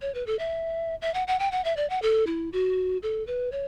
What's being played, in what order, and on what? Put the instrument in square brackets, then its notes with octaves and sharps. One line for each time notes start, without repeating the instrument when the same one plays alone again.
[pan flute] C#5
B4
A4
E5
E5
F#5
F#5
G5
F#5
E5
D5
F#5
A4
E4
F#4
A4
B4
C#5